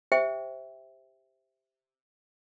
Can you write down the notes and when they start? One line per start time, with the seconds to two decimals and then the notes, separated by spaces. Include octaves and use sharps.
0.12 G4 C5 E5 G5